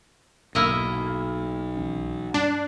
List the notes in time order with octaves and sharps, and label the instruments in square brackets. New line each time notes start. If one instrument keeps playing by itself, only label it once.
[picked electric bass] D#1 G#2 B2 [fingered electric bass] B1 [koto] A#3 E4 D#5
[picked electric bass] C2 E3 C#4
[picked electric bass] G2 G3 [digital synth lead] D4